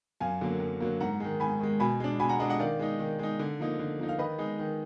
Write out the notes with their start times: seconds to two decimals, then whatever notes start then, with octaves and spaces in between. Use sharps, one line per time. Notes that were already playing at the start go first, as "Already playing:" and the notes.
0.20 F#2 F5 G#5
0.41 D3 F#3 A#3
0.60 F#2
0.80 D3 F#3 A#3
1.00 G#2 F#5 A#5
1.20 D#3 G#3
1.40 G#2 G#5 B5
1.60 D#3 G#3
1.80 B2 G#5 B5
2.00 G#3 D4
2.19 B2 G#5 B5
2.29 F#5 A#5
2.39 G#3 D4 D#5 F#5
2.50 D#5 F#5
2.59 D#3 D5 F5
2.79 G#3 D#4
2.99 D#3
3.19 G#3 D#4
3.39 D3
3.59 F3 A#3 D#4
3.79 D3
3.99 F3 A#3 D#4
4.09 F5
4.19 D#3 B4 D#5
4.38 G#3 D#4
4.59 D#3